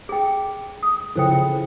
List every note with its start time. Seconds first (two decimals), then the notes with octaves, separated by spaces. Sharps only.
0.09 G#4 G5
0.83 D#6
1.16 C#3 F3 E4 A4 C5 G5